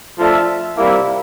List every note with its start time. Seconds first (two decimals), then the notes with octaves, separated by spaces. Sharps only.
0.18 F3 A3 D4 A4 E5
0.78 C3 G3 A#3 E4